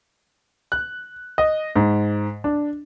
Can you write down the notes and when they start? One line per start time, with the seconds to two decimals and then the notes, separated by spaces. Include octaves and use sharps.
0.72 F#6
1.38 D#5
1.76 G#2
2.44 D4